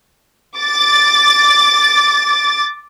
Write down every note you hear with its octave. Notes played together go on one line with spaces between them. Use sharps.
D6 A6